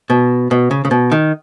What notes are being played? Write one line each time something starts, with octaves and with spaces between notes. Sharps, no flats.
B2
B2
C#3
C#3
B2
D#3